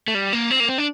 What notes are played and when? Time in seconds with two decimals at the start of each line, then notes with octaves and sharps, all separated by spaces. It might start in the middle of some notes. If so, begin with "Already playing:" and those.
0.08 A3
0.15 G3
0.33 A#3
0.50 C4
0.60 A#3
0.69 C4
0.78 D4